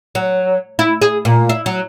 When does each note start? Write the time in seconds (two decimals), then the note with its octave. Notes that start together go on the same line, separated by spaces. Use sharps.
0.15 F#3
0.79 E4
1.02 G#4
1.25 A#2
1.49 E4
1.66 F#3